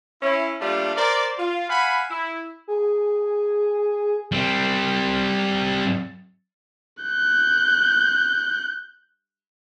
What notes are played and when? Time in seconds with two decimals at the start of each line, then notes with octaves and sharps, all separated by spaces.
0.22 C#4 E4
0.60 G3 A3 A#3 D4 F4
0.96 A#4 C5 D5
1.38 F4
1.69 F5 F#5 G#5 B5
2.10 E4
2.68 G#4
4.32 G3 C4
7.03 F#6 G6